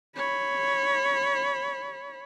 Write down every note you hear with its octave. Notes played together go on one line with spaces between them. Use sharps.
C#5 B5